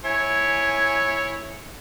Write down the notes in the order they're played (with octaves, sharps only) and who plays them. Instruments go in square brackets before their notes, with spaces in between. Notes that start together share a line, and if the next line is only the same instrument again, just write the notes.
[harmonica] E4 C#5 [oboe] G#5